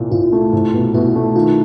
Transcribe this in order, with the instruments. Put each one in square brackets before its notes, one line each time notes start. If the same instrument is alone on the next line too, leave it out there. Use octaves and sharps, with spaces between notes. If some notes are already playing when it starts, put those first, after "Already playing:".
Already playing: [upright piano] C2 A#2
[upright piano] C2 [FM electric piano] F4
[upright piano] A3
C2
B2
[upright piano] B2 [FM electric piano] E4
[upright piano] A3
[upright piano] D#3 [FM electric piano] F4